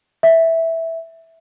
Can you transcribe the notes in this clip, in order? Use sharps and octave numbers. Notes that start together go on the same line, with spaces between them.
E5